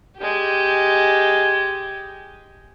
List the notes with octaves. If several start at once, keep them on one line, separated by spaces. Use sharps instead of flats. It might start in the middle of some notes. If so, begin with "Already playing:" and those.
G#3 G4